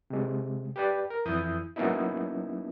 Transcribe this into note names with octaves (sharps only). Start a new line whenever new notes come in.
C3 G#3
G4 B4 D5
A#4
F2 E3 E4 D#6 G6
F#3 A#3 B3 C#4 D#4 E4